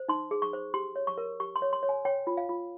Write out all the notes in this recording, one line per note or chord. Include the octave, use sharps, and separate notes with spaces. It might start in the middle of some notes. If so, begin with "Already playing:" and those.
Already playing: C5
D#4 C6
G#4
C#6
C5
G4 C6
C#5
C#6
A#4
G4 C#6
C6
C#5
C6
C#5
G#5
C#5 G5
F4
F5
F4